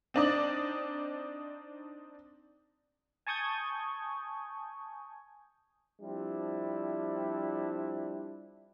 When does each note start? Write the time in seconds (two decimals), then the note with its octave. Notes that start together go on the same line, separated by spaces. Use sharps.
0.14 C4 D4 D#4 D5
3.27 G#5 A5 C#6 D#6 G6 G#6
6.01 F3 G3 C4 D4 E4